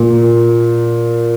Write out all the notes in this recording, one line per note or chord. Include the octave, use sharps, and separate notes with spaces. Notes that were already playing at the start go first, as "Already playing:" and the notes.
Already playing: A#2